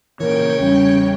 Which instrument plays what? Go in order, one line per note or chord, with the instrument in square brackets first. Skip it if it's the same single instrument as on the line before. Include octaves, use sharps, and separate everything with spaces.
[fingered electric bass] A#2 E3 [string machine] C#3 G5 [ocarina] A#4 [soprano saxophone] C#5
[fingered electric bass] E2 G3 [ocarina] C#4